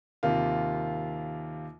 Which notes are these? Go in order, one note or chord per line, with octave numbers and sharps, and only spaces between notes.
D#2 C3 A#3 F4